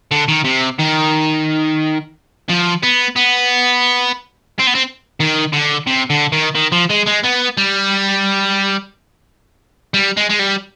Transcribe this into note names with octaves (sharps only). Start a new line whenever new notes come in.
D3
D#3
C3
D#3
F3
B3
B3
C4
B3
C4
D#3
D3
C3
D3
D#3
D#3
F3
G#3
G#3
B3
G3
G3
G#3
G#3
G3